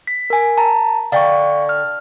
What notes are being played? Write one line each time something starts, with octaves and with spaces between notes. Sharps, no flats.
B6
A#4 G#5
A5 A#5
D3 F5 G5 C#6
F6